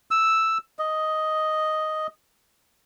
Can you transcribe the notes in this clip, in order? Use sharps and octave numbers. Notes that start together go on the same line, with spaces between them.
E6
D#5